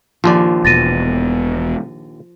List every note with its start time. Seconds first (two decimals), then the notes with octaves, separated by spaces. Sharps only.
0.24 A#1 D#2 F3 D5
0.65 E1 B2 A6 A#6 D#7